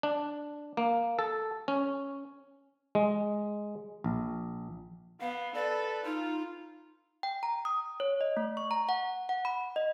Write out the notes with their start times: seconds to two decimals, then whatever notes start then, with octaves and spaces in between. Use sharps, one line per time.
0.03 D4
0.77 A#3
1.19 A4
1.68 C#4
2.95 G#3
4.04 A#1
5.21 B3 F5
5.54 A4 B4 D5
6.05 D#4 F4
7.23 G5
7.43 A#5
7.65 D#6
8.00 C#5
8.21 D#5
8.37 A3
8.57 C#6
8.71 A#5
8.89 F#5
9.29 F#5
9.45 B5
9.76 D#5